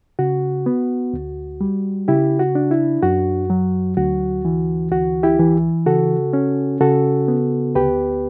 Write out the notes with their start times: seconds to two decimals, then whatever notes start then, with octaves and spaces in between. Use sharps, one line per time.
0.19 C#3 F#4
0.66 B3
1.13 D2
1.61 G3
2.08 C#3 E4 G4
2.40 F#4
2.55 D4
2.71 E4
3.03 F#2 F#4
3.50 F#3
3.97 D2 F#4
4.45 E3
4.92 D2 F#4
5.23 E4 G4
5.39 E3
5.86 C#3 F#4 A4
6.33 C#4
6.81 C#3 F#4 A4
7.28 B3
7.75 D2 G4 B4